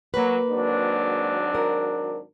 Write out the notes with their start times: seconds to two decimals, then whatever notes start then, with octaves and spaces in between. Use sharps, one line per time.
0.14 F#3 A#3 B4
0.48 G#1 F#3 D4
1.55 A#4